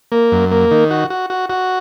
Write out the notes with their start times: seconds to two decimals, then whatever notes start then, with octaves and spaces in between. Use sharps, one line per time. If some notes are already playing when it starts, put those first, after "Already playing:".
0.12 A#3
0.32 F#2
0.51 A#3
0.71 D#3
0.90 F#4
1.10 F#4
1.30 F#4
1.50 F#4